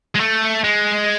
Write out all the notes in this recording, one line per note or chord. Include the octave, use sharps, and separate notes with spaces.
G#3
A3
G#3